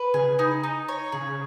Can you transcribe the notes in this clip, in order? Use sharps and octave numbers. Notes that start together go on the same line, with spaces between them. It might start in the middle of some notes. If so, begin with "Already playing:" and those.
Already playing: B4
C#3 G#4
D#4
D#4
C#5
C#3 G#4